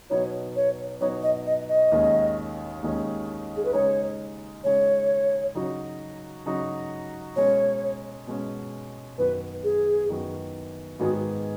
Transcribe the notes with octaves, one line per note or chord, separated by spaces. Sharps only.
B2 F#3 B3 D#4 F#4 C#5
C#5
B2 F#3 B3 D#4 F#4 C#5
D#5
D#5
D#5
D#2 D#3 G#3 C#4
D#2 D#3 G#3 C#4
G#4
B4
C#3 G#3 D#4 C#5
C#3 G#3 D#4 C#5
C#3 F#3 D#4 F#4
C#3 F#3 D#4 F#4
B2 G#3 C#4 C#5
B2 G#3 C#4
F#2 D#3 B3 F#4 B4
G#4
F#2 D#3 B3 F#4
G#2 D#3 B3 F#4 G#4